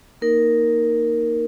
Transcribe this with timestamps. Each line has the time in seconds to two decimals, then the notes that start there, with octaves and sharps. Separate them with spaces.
0.22 A#3 D#4 A#4